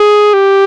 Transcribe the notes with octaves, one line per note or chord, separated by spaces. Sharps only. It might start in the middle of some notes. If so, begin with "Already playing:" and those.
Already playing: G#4
G4